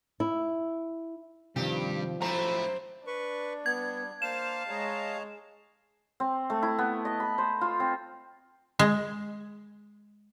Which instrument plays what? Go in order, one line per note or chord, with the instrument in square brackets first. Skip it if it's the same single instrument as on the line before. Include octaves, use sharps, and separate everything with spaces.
[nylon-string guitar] E4
[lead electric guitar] G2 [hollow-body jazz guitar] C3 D#3 [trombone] F3 [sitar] G4
[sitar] F#2 C4 [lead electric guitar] A3 E4 [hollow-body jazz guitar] A#5
[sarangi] D4 [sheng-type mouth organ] B4 C#6
[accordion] G3 [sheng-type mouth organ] B3 [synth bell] G#6
[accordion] A#3 C5 F6 [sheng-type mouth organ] F5 A5 [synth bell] E7
[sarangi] G#3 [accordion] C#5 D#5 A#5
[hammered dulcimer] C4
A3
E4
B3
D#5
B5
C5
F4
C4
[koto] G#3